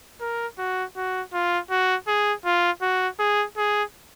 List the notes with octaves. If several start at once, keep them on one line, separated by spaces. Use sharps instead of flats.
A#4
F#4
F#4
F4
F#4
G#4
F4
F#4
G#4
G#4